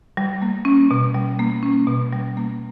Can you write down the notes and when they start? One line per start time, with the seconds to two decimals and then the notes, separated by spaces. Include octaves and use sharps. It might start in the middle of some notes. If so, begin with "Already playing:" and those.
0.17 G3
0.42 A#3
0.65 C#4
0.91 B2
1.14 G3
1.39 A#3
1.63 C#4
1.87 B2
2.13 G3
2.37 A#3